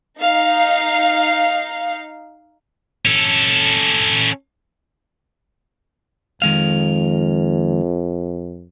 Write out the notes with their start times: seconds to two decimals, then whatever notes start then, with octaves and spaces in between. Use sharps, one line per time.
0.19 D#4 F5
3.05 C#4 A4
6.42 F2 D#3 G#3 F5